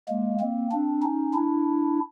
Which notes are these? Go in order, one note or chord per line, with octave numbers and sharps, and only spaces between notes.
G#3 A#3
A#3 C4
C4 D4
C#4 D#4
D4 E4